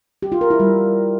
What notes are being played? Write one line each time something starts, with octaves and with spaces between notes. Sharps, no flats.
G4
F4
A#4
E4
G3